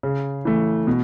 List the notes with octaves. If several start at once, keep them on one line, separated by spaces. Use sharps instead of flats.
C#3
E3 A3
B2